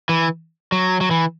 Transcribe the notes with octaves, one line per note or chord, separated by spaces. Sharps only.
E3
F#3
F#3
E3